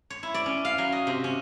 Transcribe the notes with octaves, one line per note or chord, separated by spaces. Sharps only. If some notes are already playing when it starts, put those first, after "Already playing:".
C#5
E4
D5
C#4
F5
F#3
D#5
C3
C#4